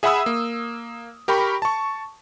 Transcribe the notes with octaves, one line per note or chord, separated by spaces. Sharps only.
G#4 E5 F#5 B5 D#6 E6
A#3
G4 A#4 G5 B5 C#6
A5 C#6